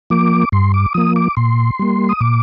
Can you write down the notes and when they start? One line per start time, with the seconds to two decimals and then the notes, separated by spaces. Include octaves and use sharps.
0.10 F3 A#3 D6
0.52 G2 C6
0.74 D6
0.94 F3 A#3 D#6
1.16 D6
1.37 A#2 C6
1.79 G3 A#3
2.09 D#6
2.21 A#2 D6